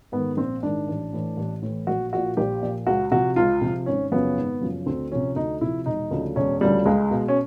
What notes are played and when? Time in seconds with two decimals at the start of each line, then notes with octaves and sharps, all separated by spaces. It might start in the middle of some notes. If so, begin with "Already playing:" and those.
0.12 G#2 D#3 B3
0.37 A#1 C4
0.63 G#2 D#3 D4
0.88 A1
1.13 A2 E3
1.37 A1
1.62 A2 E3
1.87 A#1 F#4
2.13 A#2 F3 F#4
2.37 A#1 G4
2.62 A#2 F3
2.87 C#2 F#4
3.11 C3 F3 F#4
3.36 C#2 F4
3.61 C3 F3
3.86 G#1 C#4
4.11 F#2 C#3 F3 B3
4.37 G#1
4.61 F#2 C#3 F3
4.86 D2 C4
5.11 C3 F3 C#4
5.36 D2 D#4
5.61 C3 F3 E4
5.86 E1 D#4
6.11 D2 C#3 F3
6.36 E1 C#4
6.61 D2 C#3 F3 G3
6.85 C#2 G#3
7.11 B2
7.28 C#4